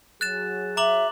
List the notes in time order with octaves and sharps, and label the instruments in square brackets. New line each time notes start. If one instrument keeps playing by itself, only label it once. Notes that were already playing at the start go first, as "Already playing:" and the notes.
[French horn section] F#3 G#4 [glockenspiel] F#6 A6 E7
[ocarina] E5 [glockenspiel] A#5 D6 F#7